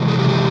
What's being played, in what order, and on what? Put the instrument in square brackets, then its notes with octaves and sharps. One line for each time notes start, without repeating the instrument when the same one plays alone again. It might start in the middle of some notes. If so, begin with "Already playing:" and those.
Already playing: [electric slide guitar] C3 E3 G#3
G#4
G4
G4